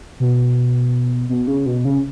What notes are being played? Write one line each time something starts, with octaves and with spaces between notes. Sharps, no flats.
B2
B2
C#3
B2
C#3